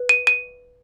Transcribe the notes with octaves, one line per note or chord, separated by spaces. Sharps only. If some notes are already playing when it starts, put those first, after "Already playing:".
Already playing: B4
D#7
D#7